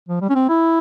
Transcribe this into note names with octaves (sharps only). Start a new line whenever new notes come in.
F3
G3
C#4
C4
E4